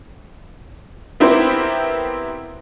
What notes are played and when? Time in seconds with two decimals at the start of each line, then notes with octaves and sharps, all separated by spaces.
1.20 B3 C4 E4 G4 A#4 C5